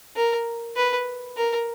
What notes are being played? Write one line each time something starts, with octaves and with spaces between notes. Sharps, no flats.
A#4
B4
A#4